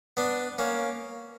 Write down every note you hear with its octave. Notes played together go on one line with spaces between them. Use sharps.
B3 D4
A#3 C#4